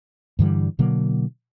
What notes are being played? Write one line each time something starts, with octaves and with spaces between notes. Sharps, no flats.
G2 D3 E3 G3
B2 D3 F#3 A#3